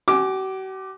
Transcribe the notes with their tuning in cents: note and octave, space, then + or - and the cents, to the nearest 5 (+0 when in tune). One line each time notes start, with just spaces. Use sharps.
F#4 +45 G#5 +0 D6 +0